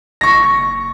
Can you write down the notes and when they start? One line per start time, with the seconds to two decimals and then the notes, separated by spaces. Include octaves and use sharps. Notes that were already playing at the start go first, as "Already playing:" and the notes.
0.21 F#1 C#6 A#6